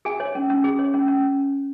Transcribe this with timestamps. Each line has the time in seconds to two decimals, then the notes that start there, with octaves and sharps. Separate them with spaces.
0.05 G#4 G#5
0.20 C#5
0.35 C#4
0.50 C#4
0.64 G#4
0.79 C#5
0.94 C#4
1.08 C#4